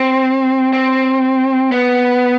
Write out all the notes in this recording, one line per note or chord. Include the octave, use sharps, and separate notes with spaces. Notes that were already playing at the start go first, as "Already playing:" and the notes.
Already playing: C4
C4
B3